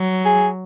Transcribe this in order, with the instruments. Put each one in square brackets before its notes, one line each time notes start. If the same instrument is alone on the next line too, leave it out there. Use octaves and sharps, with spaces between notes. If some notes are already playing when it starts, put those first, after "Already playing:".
Already playing: [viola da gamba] F#3
[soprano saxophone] G#4